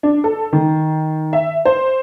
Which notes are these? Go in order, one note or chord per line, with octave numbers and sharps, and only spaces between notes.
D4
A4
D#3
E5
C5